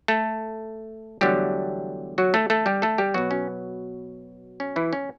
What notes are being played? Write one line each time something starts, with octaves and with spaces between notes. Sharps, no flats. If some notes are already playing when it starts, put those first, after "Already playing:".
A3 A4
E2 D3 F#3 G3 A3 G4
F#3 F#4
A3 A4
A3 A4
G3 G4
A3 A4
G3 G4
B2 F#3 B3 F#4
C#4
C#4
E3 E4
C#4